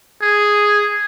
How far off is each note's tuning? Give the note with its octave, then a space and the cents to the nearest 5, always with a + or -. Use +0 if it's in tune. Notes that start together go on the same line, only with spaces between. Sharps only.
G#4 +0